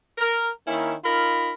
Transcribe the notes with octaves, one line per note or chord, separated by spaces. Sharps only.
A#4
D#3 A#3 C#4 E4
D#4 F4 A#4 B5